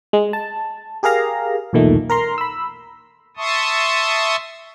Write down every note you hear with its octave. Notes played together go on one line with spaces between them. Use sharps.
G#3
A5
G4 G#4 A#4 F5 A#5
B1 E2 A#2 D#3 A3
A#4 A#5 C6
B5 E6
E5 A5 C6 C#6 D#6